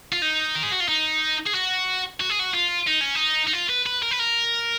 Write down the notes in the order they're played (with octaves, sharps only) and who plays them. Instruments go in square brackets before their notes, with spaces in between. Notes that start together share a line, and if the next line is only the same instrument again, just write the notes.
[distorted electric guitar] F4
D#4
A#4
G#4
F#4
F4
D#4
G#4
F#4
F#4
G#4
F#4
F4
D#4
C#4
D#4
D#4
F4
B4
B4
A#4
B4
A#4